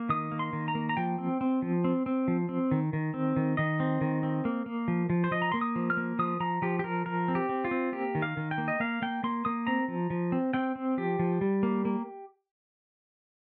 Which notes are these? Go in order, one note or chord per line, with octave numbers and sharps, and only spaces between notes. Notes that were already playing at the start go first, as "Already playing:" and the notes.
Already playing: A#3
D#3 D#6
A#3
C6
D#3
A#5
A#3
A#5
F3 G5
C4
C4
F3
C4
C4
F3
C4
D#3
D#3
C4
D#3
D#3 D#5
C4
D#3
C4
A#3
A#3
F3
F3
C5
F3 D#5
A#5
A#3 C6
D#6
F3
F6
A#3
F3 D#6
F3 A#5
F3 G4
G4
F3 A#4
F3 A#4
C4
G4
C4
F4
C4
A#3 G4
D#3
F5
D#3
G5
A#3
D#5
A#3 F5
A#3 G5
A#3 C6
A#3 D#6
C4 A#5
F3
F3
C4
C4 G5
C4
F3 G4
F3
G3
A#3
A#3